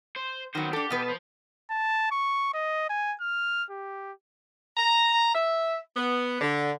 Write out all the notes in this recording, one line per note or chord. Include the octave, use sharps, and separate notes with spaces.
C5
D#3 F#3 B3 C5
D4 G4 A4
B2 B3 B4
C5 A5
A5
C#6
D#5
G#5
F6
G4
A#5
E5
B3
D3